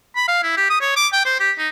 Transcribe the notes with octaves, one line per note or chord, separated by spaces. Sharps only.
B5
F5
E4
G4
D#6
C#5
D6
G5
C5
G4
D#4